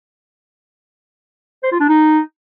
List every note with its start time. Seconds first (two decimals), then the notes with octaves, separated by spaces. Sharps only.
1.63 C5
1.72 F4
1.80 D4
1.89 D#4